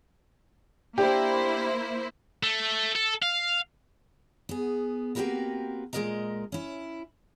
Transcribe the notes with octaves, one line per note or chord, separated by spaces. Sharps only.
A#3 D4 E4 G4 C5
A3
A4
F5
B3 G#4
A#3 C4 F#4 G4 A#4 B4
A#2 G#3 G4 A#4 D#5 A#5
C#4 E4